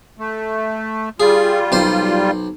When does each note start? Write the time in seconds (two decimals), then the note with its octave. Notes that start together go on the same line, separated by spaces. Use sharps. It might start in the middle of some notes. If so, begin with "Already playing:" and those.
0.19 A3
1.20 G3 F4 G#4
1.72 B1 C5